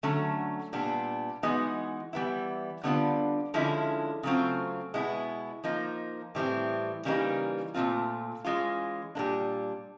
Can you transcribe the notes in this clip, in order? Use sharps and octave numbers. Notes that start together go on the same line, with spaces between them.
D3 F#3 A3 C#4
A#2 G3 B3 D4
E3 G#3 B3 D#4 F#4
E3 G3 B3 E4
D3 G3 B3 D4 F4
D3 F3 G#3 C#4 E4
C#3 F#3 A3 C4 F4
B2 G#3 B3 E4
F3 A#3 D#4
A2 E3 G3 C4 E4
C#3 E3 G3 A#3 D#4
A#2 F3 A3 C4 F4
E3 G#3 C#4 F4
A#2 G3 A#3 D4